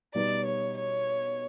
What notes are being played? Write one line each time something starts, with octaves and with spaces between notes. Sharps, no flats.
B2 G3 B3 D#4 D5
C#5
C#5